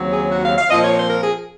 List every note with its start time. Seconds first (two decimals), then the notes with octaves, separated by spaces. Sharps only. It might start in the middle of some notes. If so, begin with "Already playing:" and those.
Already playing: D#2 C#3 F#3 C4
0.10 G#4
0.30 F#4
0.43 F5
0.57 F5
0.69 A#2 F3 C4 D#5
0.82 C#5
0.96 C5
1.09 A#4
1.22 G#4